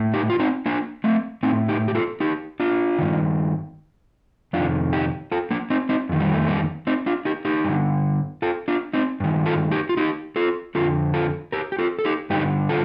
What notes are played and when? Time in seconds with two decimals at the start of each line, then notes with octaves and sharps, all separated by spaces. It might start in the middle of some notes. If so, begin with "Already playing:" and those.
Already playing: A2
0.14 D#4 G4
0.30 F4
0.39 C4 D#4
0.66 A#3 D4
1.04 A3 C4
1.43 A2 C4 D#4
1.69 D#4 G4
1.88 G4
1.95 F4 A4
2.20 D#4 G4
2.60 D4 F4
2.99 G2 D#3
4.53 F2 C3 D#3 D4 F4
4.93 D#4 G4
5.32 F4 A4
5.51 A#3 D4
5.70 C4 D#4
5.89 C4 D#4
6.09 F2 D#3
6.20 G3
6.34 A3
6.48 G3 A#3
6.87 C4 D#4
7.06 D4 F4
7.25 D#4 G4
7.45 D#4 G4
7.64 G2 D3
8.42 F4 A4
8.68 D4 F4
8.93 C4 D#4
9.20 G2 D#3
9.46 F4 A4
9.71 D#4 G4
9.89 F4
9.97 D#4 G4
10.36 F4 A4
10.75 F2 D3 F4 A4
11.14 F4 A4
11.52 G4 A#4
11.72 G4
11.79 F4 A4
11.99 A4
12.05 D#4 G4
12.30 G2 D3 D#4 G4
12.69 F4 A4